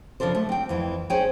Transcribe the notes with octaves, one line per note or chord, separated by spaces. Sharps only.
C#3 F3 D4 A4 C5
A3
C4 G5
F2 E3
C#4 G#4 C5 C#5 G5 G#5